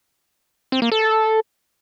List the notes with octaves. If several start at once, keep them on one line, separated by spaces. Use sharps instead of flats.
C4
A#3
A4